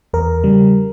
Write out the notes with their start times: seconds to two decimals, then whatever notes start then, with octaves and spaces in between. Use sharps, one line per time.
0.13 E2 A#4
0.44 C#3 G3